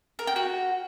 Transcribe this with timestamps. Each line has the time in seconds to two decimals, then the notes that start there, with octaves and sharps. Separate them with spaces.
0.19 A#4
0.27 G5
0.36 F#4